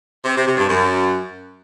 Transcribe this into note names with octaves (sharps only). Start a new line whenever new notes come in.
C3
C3
C3
G2
F#2